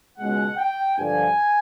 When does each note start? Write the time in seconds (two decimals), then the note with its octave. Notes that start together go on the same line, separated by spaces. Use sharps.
0.19 C#2 B2 G#3 F#5
0.58 G5
0.98 G2 D3 F3 G#5